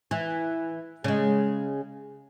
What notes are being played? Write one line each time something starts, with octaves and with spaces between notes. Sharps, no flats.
E3
C#3 G#3